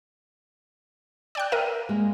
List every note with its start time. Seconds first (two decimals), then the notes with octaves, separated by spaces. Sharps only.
1.35 D5 G5 F#6
1.52 A#4 E5 D#7
1.89 G#3 A#3